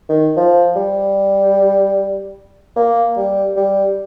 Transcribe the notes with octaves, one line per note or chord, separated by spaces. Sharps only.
D#3
F3
G3
A#3
G3
G3